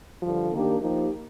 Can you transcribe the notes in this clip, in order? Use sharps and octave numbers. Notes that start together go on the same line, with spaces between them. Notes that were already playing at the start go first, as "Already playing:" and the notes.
G2 D3 F3
D#3 A#3 D4 G4
F3 A#3 D#4 G4